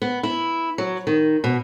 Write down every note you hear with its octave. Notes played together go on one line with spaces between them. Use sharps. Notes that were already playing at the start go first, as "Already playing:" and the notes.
B3
E4
F#3
D#3
B2